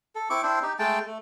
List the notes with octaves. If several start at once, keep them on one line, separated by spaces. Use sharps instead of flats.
A4
C4 E4 C#6 D6
C4 D4 E4 C5
D#4 G4
G#3 A3 G5 A5
A3